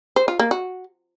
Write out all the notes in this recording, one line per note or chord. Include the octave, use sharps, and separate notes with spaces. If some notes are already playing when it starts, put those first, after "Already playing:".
C5
F4
A#3
F#4